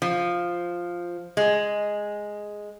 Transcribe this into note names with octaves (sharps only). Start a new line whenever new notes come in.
F3
G#3